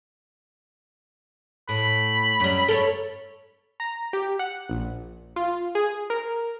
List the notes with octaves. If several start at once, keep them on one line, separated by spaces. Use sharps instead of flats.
A2 B5
F#2 G3
A4 A#4 C#5
A#5
G4
F#5
A#1
F4
G#4
A#4